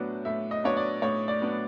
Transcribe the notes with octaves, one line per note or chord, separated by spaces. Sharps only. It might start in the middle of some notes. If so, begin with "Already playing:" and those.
Already playing: A2 F#3 B3 D4
A2 E5
D#5
F#3 B3 D4 C#5
D5
A2 C#5
D5
F#3 B3 D4